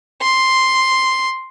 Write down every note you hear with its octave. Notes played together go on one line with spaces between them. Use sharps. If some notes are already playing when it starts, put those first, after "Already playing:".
C6